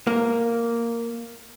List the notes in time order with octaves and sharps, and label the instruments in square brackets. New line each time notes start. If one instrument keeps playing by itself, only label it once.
[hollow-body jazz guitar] A#3